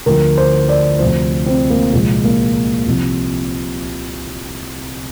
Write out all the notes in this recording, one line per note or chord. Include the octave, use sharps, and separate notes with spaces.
D2 D3 F3 A#4
C5
D5
D2 C3 F3 C5
C4
A#3
C2 A#2 F3 G#3
A#3
C2 C3 F3